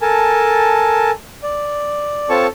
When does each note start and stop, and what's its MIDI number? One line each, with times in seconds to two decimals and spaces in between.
0.02 1.11 69
0.02 1.11 70
0.02 1.11 80
0.02 1.11 81
1.43 2.29 74
2.29 2.47 60
2.29 2.47 65
2.29 2.47 69
2.29 2.47 73
2.29 2.47 81
2.29 2.47 85